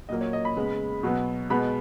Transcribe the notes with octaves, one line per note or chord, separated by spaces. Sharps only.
A#2 F#3 A#3 D#5
C#5
D#5
B5
C#3 G#3 B3
B2 F#3 B3
B2 G#3 B3 B5